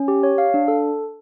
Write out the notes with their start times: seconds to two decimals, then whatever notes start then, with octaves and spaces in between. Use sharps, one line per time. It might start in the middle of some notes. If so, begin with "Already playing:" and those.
Already playing: C#4
0.08 G4
0.23 C#5
0.38 F5
0.54 D4
0.68 A4